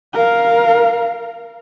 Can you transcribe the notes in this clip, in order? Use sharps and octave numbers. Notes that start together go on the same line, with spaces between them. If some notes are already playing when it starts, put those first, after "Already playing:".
A#4 F5